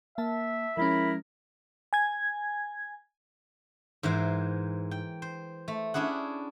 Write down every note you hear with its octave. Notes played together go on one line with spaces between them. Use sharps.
A#3 E5 A5
F3 G#3 C#4 E4 A#4 B5
G#5 G#6
G#2 E3 A#4 C5
G5
C5
A3
C#4 D4 E4 G#4 F#5